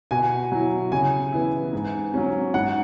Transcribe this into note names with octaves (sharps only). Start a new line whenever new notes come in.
B2 G#5
F#3 E4
C#3 G#5
E3 B3 E4
G#2
F#3 C#4
G#2 F#5